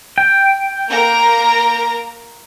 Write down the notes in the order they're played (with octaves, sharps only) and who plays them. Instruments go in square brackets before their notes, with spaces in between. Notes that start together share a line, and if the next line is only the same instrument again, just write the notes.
[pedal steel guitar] G5
[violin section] A#3 A#4 A#5